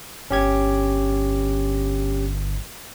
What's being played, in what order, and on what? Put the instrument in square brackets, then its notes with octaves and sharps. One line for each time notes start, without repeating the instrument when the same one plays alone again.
[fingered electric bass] G1 [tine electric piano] C#4 G4 G#6